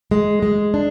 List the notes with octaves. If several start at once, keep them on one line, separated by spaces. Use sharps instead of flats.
G#3
G#3
D4